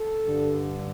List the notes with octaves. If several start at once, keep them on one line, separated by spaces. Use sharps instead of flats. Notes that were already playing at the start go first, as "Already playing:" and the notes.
Already playing: A4
G2 D3